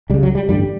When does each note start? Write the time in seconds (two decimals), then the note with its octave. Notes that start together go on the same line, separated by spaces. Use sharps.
0.10 C#2 G3
0.14 C#3
0.23 F#3
0.35 G3
0.49 A1 G2 D3 G3